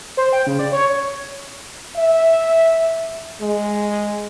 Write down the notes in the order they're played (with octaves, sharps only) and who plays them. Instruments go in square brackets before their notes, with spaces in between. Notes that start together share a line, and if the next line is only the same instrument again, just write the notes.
[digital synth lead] C5
G5
C#3
D5
C#5
[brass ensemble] E5
G#3